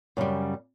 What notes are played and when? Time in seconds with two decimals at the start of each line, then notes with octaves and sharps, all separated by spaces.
0.17 F#2 C#3 G3